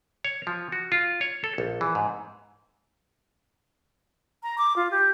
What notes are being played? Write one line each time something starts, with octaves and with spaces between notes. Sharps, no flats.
C#5
F3
F#4
F4
C#5
A4
A#1
E3
G#2
A#5
D6
F4
G4